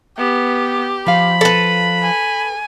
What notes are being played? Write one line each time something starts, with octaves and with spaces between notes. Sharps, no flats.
B3 G4
F3 F5 B5
A4 B4
G#5